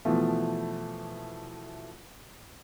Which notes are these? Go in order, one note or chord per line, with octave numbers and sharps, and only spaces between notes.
B2 E3 F3 A3